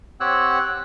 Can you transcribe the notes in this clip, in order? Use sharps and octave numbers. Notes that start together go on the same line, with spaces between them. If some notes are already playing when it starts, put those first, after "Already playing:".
C4 G4 C#5 F#5 E6 F#6